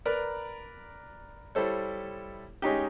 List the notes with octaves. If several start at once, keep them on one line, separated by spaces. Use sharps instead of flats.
A#4 B4 D5 A#5
G3 E4 A4 C5 C#5
G#3 C#4 D#4 G4